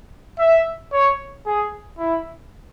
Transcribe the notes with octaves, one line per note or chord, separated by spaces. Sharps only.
E5
C#5
G#4
E4